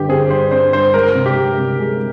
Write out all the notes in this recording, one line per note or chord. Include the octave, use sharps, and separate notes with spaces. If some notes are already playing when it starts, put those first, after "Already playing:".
Already playing: G2 D3 G4
C4 G#4
G2 C5
C4 C5
G2 C5
G#3 A#4
C3
G4
G#3
C3
G#3